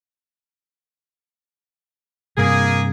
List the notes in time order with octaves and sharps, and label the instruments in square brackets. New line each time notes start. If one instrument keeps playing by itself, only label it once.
[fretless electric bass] G2 C3 [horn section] A#3 G#4